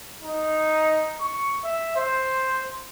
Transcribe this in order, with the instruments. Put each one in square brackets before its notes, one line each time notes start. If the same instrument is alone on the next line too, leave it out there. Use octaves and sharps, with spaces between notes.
[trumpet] D#4
C#6
E5
C5